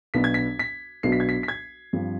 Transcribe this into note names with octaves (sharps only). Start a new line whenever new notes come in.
B1 B2 B3 D4 B6
G#6
B6
B6
B1 B2 B3 D4 C7
B6
G#6
B6
B6
G#6
G2 F3 C4